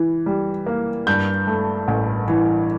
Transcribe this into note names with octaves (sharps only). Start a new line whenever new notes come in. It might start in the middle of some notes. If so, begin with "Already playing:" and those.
Already playing: E3
G3
A#3
G2 G6
A3
A1
E3